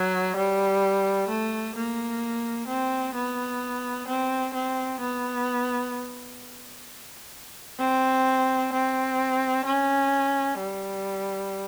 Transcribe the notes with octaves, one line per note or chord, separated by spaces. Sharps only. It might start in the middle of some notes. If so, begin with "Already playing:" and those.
Already playing: F#3
G3
A3
A#3
C4
B3
C4
C4
B3
C4
C4
C#4
G3